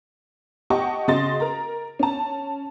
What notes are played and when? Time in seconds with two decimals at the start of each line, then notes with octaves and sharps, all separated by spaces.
0.70 G4 D#5 F#5 G5 A5 C#6
1.08 C#3 F#4 G#4 D#5 C6 A6
1.40 A#4 A#5
1.99 C#4 A5